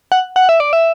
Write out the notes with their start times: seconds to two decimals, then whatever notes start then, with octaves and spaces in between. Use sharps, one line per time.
0.12 F#5
0.36 F#5
0.49 E5
0.60 D5
0.73 E5